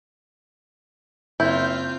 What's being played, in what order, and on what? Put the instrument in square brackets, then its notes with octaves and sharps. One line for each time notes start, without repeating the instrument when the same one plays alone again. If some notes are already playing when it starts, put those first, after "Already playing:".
[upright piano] F#1 [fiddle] C4 F4 [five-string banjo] E4 [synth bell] G6